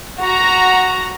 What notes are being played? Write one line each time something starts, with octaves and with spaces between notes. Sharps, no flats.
F#4 A#5